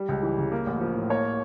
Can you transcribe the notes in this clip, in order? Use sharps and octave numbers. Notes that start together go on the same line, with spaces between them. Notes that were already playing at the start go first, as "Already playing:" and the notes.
Already playing: G3
C#2
E3
C#3
A#3
A1
F3
A2
A#3 C#5